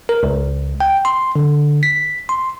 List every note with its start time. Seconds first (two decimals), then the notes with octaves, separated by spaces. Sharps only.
0.09 A#4
0.23 C#2
0.80 G5
1.05 C6
1.36 D3
1.83 B6
2.29 C6